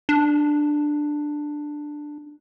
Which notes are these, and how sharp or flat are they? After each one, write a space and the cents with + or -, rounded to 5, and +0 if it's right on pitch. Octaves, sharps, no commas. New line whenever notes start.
D4 +10